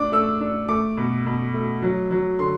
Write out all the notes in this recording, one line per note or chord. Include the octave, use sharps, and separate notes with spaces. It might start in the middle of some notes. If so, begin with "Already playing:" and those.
Already playing: A3 D4 D6
A3 E6
D4
A3 D6
B2
B2
A3
F#3
F#3
D3 C6